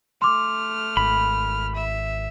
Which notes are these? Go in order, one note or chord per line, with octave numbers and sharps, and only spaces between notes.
A3 C6 D6 F6
G#1 B5
E5